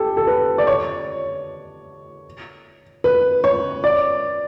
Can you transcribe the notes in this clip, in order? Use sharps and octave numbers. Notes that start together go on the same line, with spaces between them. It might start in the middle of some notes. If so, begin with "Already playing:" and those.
Already playing: G4 A4
A4
B4
D5
C#5
B4
C#5
D5